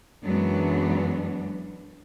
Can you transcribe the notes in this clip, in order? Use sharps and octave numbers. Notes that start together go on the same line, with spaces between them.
F#2 E3 F#3 G#3 B3 D4